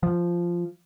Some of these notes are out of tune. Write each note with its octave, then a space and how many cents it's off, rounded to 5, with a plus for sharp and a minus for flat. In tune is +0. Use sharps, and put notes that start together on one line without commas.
F3 -10